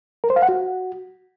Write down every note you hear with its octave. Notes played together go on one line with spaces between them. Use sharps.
A#4
C5
F5
F#5
F#4